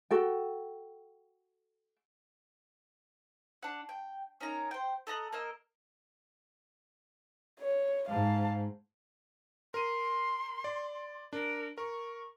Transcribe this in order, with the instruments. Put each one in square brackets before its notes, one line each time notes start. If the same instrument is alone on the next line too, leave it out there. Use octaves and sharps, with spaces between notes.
[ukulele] F#4 A4 G5
[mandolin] D4 F#5
G5
C#4 D#4 A#4 A#5
C5 G5
A4 D#5 A#5 F#6
A#3 A#4 D#5 E6
[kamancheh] C#5
[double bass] G#2 [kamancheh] F5 A5
[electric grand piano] A#4 D#7 [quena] C6
[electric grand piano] D5
[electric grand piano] D4 [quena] A#4
[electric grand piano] A#4 [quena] C#6